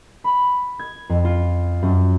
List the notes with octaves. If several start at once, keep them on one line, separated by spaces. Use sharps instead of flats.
B5
G#6
F2
F4
F#2